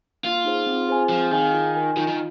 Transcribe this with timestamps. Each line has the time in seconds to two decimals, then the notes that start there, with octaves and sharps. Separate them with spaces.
0.24 A#3 F4
0.45 D#4 G#4 C5
0.67 C4
0.89 G#4 C5 G#5
1.10 F3 C4
1.32 D#3 G#4 F5 G#5
1.53 F4
1.75 A#4 G#5
1.97 D#3 F4
2.07 D#3